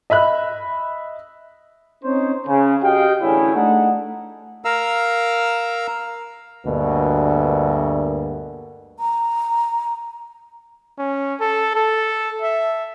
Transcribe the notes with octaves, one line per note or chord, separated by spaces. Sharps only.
D#5 E5 B5 F#6
C4 C#4 D#4 C5 C#5
C#3
F#4 G4 D#5 F5 G5
A1 D3 C#4 E4 G#4 C#5
A3 D4 D#4 A4 F#5
A#4 F5 A#5 E6
D2 G2 B2 A#3
A#5
C#4
A4
A4
E5